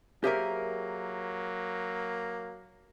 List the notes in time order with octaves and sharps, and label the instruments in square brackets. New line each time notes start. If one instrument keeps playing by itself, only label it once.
[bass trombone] F#3 [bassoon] A#3 [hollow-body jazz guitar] G4 G#4 A#4 [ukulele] C5 C#5 E5